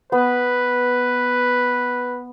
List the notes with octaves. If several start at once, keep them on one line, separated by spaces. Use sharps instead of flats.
B3 B4